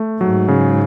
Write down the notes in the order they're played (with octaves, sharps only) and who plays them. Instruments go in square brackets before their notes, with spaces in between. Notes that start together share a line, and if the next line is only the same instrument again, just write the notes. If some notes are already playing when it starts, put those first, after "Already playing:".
Already playing: [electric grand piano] A3
[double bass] G#2 [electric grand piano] F#3
[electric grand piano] C#3